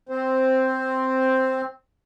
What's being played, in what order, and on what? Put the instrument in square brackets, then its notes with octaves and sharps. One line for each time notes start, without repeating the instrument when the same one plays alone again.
[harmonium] C4 C5